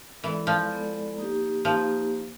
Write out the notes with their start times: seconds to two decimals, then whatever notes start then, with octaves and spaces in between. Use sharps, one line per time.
0.23 E3 G#3 B3 E4 A4 D5
0.47 F3
0.70 G#3 B3 E4 A4 D5
1.17 A#3 D#4 G4
1.64 F3 A#3 D#4 G4